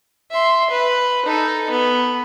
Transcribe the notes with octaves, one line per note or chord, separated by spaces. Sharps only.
E5 C6
B4
D#4 A4
B3